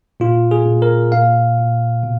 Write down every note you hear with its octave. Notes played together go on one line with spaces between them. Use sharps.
A#2 F4
G#4
A#2
A#4
A#2 F5
A#2
B2